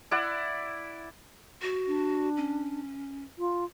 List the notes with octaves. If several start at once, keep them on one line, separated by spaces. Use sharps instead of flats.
E4 D5 F#5
F#4
D4
C#4
F4